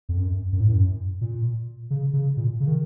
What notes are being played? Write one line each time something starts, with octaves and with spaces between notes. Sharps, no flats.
F2
F#2
F#2
A2
F#2
A#2
C#3
C#3
A#2
C#3
D#3